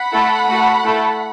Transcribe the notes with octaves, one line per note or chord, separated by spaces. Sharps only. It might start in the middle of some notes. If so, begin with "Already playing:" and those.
Already playing: F#5 B5
A3 E4 A4
A3 F#4 A4
A3 E4 A4